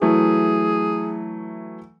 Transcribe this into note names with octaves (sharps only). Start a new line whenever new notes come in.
E3 F#3 A3 G#4